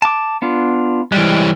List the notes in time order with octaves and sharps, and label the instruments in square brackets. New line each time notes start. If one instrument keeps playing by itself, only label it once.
[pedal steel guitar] A5 D6
B3 D4 F4
[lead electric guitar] E3 G3 [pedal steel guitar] G#3 G5